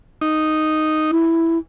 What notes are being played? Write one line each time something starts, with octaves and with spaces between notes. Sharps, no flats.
D#4
E4